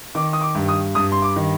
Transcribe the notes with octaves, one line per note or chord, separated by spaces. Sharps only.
D#3 D6
D#6
D6
G2
D#6
G2 D#6
C6
D6
D#3